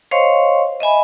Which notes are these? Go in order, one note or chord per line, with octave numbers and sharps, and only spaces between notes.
C5 C#5 D#5 F5 C6 C#6
D#5 E5 G#5 B5